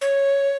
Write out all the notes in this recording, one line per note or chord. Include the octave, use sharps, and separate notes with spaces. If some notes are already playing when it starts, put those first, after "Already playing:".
C#5